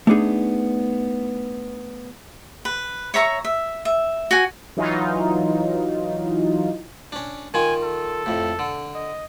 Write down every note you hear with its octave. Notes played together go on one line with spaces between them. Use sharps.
A3 B3 D4 D#4 G#4
B4
C#5 E5 A#5 C#6
E5
E5
F#4 G#5
E3 F#3 D#4 F4
C#4 D4
D#3 F4 G#5
A4
F2 A2
D3
D#5